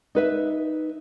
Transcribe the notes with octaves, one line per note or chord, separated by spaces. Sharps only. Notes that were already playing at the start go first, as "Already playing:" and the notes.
D#4 B4 E5